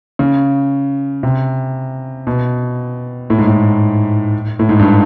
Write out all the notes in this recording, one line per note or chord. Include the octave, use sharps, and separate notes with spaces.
C#3
C3
B2
A2
G#2
A2
A2
G#2
G2